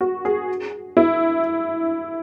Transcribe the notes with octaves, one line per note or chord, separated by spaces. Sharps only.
F#4
G#4
E4